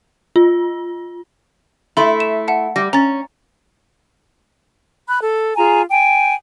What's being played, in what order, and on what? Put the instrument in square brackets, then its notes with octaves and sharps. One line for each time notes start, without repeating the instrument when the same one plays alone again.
[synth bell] F4
[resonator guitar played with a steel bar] A3 E4 [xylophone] B5 C6
[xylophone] E7
E5 F#5 A5
[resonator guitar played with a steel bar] G3 [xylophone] A#6
[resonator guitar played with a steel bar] C#4 [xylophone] A#5 A6
[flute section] B5 F#6
A4
F4 G#4 G#5 A#5
G5 G#5